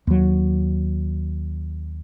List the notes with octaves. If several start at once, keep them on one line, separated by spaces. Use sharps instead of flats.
D#2 F#3